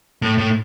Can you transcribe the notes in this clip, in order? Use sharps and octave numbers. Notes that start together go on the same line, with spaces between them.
A2
A2